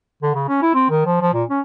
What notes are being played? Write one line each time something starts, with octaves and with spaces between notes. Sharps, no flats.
D3
C#3
C#4
E4
C4
D#3
F3
F3
A#2
C#4